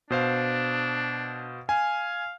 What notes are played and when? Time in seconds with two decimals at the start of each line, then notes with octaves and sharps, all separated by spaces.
0.10 B2 D4 C5 F5
1.69 F5 G#5